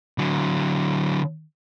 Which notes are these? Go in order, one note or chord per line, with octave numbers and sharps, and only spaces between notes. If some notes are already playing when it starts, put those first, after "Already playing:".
D3 F#3